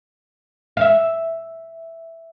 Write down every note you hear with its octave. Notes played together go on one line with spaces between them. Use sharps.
E5 F5